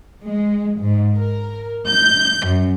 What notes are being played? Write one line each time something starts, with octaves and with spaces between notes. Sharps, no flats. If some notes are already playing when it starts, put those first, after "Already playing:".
G#3
G#2
A#4
G6
F#2